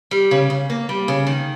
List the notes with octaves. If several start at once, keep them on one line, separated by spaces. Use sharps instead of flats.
G3
C#3
C#3
A#3
G3
C#3
D#3